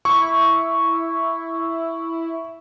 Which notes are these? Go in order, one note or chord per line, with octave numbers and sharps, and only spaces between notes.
E4 C#6